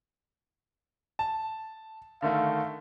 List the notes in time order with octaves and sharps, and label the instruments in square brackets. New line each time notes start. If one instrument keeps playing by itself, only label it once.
[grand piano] A5
[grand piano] D3 D#3 A3 [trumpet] F5